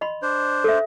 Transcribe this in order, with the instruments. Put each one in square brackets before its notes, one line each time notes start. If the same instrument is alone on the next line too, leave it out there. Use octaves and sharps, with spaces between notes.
[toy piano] D#5 B5 C6
[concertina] D4 C5
[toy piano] A4 E5